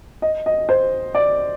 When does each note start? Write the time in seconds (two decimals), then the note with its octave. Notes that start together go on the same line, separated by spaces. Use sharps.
0.22 D#5
0.46 D#5
0.69 C5
1.15 D5